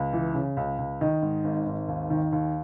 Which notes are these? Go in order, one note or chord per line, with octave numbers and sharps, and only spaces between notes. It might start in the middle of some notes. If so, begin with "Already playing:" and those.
Already playing: C#2
E3
C#3
C#2
C#2
D#3 D#5
G#2
G#1
G#1
D#2
D#3
D#2